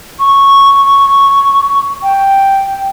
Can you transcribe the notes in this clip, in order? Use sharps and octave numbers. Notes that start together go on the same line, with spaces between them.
C#6
G5